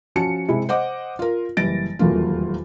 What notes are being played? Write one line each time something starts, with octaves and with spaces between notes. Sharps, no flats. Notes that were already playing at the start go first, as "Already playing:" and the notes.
F3 C#4 F#4 A5 C#7
C3 G#3 E4
C5 D#5 F#5 D6
F4 A#4
F#1 E3 G3 A6 A#6 D7
D#1 E2 F#3 A3 A#3 F4